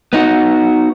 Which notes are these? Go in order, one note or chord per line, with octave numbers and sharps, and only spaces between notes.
B3 D#4 F#4